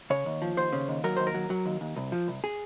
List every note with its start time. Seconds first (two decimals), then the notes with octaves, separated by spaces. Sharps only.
0.10 C#3 C#5
0.26 D#2
0.42 F3
0.57 D#2 C5
0.73 C#3
0.88 D#2
1.04 F#3 A#4
1.17 D#2 C5
1.27 A#4
1.34 F#3
1.50 F#3
1.66 D#2
1.81 D#2
1.96 C2
2.12 F3
2.28 C2
2.44 G#4